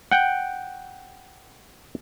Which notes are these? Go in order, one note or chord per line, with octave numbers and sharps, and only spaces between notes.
F#5 G5